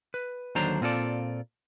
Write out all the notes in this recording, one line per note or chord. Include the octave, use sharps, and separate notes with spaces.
B4
D#2 D3 F#3 D4 C5 A#5
A#2 C4 F4 A4 D5